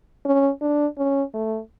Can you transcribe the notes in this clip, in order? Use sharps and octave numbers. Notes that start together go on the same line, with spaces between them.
C#4
D4
C#4
A3